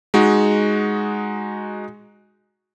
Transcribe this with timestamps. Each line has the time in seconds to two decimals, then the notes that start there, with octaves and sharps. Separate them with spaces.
0.14 G#3 D#4 F#4